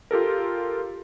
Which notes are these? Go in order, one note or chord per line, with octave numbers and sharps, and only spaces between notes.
F4 G4 A4 A#4